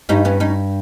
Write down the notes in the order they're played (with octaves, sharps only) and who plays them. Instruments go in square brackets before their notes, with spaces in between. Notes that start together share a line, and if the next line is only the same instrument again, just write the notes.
[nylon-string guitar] G2 [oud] C#4 D#4
[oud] B3 C#4
C#4 D#4